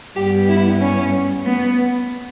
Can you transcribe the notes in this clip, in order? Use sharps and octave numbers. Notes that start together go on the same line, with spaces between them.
G2 G3 B3 G4
E4
C#4
B3